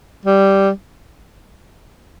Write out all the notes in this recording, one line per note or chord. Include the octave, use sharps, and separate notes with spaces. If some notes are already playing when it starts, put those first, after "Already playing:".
G3